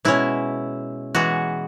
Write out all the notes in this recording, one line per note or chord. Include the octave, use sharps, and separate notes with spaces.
B2 G#3 C#4 E4
E3 G#3 B3 F#4